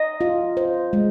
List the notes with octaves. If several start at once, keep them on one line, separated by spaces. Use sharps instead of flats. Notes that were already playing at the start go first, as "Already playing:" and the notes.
Already playing: D#5
F4
C5
G#3